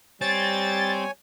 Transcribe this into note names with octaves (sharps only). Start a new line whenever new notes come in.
G3 C4 C#5 G#5 A6